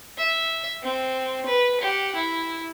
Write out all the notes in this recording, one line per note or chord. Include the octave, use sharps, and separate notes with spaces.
E5
C4
B4
G4 F#5
E4